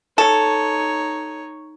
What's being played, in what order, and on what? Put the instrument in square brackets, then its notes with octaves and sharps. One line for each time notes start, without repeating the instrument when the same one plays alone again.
[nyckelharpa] D#4 C#5 [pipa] A4